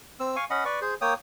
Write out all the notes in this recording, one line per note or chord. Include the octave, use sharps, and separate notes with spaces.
C4 E6
F5 G#5 C#6
C#4 D#5 F#5 B5
B4 D5 C#6
G#4 C5
A#3 C#5 G5 D#6